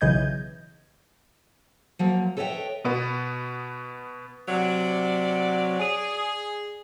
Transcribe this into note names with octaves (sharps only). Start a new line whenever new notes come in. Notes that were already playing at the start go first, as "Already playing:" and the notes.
B1 C#3 E3 D#5 G6 G#6
F3 F#3 A#3
A4 B4 C#5 D#5 E5 G5
B2 B3
C3 F#3 D5
G#4